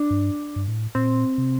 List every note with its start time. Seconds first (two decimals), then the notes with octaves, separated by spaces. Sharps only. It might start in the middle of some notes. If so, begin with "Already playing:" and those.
Already playing: D4
0.11 G2
0.56 G2
0.67 A2
0.95 A#2 C4
1.38 C3